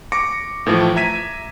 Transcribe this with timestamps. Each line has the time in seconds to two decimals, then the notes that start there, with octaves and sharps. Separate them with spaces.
0.12 C#6 D6 A#6 C#7
0.66 A2 E3 F3 A3 E4
0.96 E5 A#5 G#6 B6 D#7